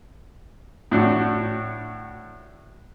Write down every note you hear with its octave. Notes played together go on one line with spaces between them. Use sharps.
A2 D4 F#4